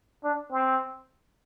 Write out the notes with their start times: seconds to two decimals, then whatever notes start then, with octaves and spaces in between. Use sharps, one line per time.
0.24 D4
0.52 C4